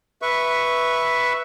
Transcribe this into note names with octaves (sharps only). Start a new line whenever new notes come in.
B4 E5 C#6